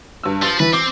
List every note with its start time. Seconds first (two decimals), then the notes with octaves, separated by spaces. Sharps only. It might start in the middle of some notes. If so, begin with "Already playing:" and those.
0.23 G2 E6
0.43 F3 A6
0.60 E3 B4
0.73 C4 D6